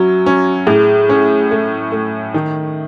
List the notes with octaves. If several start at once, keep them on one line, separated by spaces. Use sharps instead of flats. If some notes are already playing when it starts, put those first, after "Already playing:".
Already playing: F#3 C#4 E4 F#4
C#4
A2 G#4
C#4
A3
A3
D#3